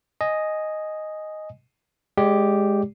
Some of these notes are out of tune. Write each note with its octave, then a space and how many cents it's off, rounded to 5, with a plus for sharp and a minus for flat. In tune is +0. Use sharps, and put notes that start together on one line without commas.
D#5 +0 G#5 +0
G#3 +0 G4 +0 D5 -25